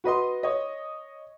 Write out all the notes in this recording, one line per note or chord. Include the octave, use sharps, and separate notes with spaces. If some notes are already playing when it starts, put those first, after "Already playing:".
F#4 B4 D#5 C6
C#5 D#5